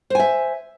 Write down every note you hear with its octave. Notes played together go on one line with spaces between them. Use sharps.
C5 E5 G#5